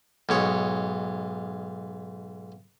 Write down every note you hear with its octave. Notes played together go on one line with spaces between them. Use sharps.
B1 G#2 C#5